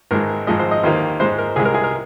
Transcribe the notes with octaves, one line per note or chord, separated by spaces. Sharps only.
G#1 G#2 G#3 A#4
G#1 G#2 F3 G#3 D#5
C5
D#5
D#2 D#3 A#3 C5
G#2 G#3 C5
A#4
C2 C3 G#3 G#4
A#4
G#4
A#4